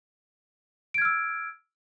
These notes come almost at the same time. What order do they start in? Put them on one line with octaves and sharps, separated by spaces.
D7 G#6 F6 E6